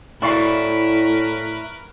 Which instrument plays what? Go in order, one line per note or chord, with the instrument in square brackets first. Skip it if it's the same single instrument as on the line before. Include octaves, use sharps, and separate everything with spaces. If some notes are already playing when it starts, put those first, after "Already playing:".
[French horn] A2 [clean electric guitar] E4 D5 F5 [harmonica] A#4 B4 B5 [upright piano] C#6